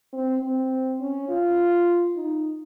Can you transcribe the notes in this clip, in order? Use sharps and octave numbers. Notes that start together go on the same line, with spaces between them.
C4
C4
C#4
F4
D#4